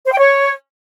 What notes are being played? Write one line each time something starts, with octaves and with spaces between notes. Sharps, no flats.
C5
G5
C#5